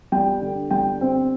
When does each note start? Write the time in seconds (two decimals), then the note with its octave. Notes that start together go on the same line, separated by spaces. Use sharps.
0.12 G3 G5
0.41 D3
0.71 G3 G5
1.01 C4